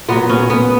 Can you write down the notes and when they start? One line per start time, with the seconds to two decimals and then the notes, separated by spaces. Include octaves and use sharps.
0.08 A#2 F#3 B3
0.29 C#4
0.50 B3